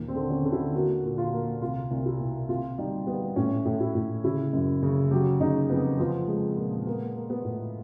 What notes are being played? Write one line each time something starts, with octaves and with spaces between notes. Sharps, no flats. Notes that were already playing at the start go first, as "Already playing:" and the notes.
Already playing: D#2 A#2
C4
D3
C#4
D3
E4
A#3 F#4
A#2
F4
A#3
C2 F4
C2
E4
B2
C3 F4
G3 D#4
G3 B3
A2 C#4
A2
E4
A2
C#3 E4
F#2
C#3
F#3 G4
C#3 D#4
F2 B3
F3 B3
G#3
A#2
A#3 B3
A#3
B3
A2